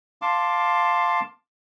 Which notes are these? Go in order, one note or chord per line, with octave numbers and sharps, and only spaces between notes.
F5 A5 C6 D6